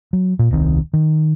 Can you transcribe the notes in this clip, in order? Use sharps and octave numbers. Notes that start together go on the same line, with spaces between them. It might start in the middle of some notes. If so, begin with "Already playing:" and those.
F#3
A#2
D#1 C2 D#3 C4
D#3